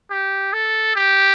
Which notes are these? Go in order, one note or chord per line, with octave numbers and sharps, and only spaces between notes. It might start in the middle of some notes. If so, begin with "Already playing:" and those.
G4
A4
G4